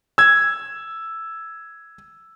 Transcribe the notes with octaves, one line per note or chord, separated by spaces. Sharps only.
E6 G#6